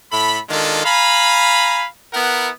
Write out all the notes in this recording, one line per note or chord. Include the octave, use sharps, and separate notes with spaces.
A2 A4 B5
D#3 G#3 D4 F4 A4
F5 G#5 A#5 B5
B3 E4 A#4 F#5